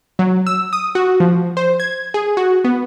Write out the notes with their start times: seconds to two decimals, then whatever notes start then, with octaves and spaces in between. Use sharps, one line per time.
0.19 F#3
0.47 E6
0.73 D#6
0.95 F#4
1.20 F3
1.57 C5
1.80 G#6
2.14 G#4
2.37 F#4
2.64 B3